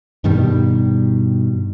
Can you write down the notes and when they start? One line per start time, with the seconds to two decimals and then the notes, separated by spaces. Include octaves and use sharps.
0.24 G2 B2 D#3 G3